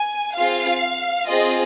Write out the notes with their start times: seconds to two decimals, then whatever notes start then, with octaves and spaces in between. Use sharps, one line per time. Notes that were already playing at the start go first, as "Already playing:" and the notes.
Already playing: G#5
0.35 C4 F4 G#4 F5
1.27 C4 F4 G#4 D#5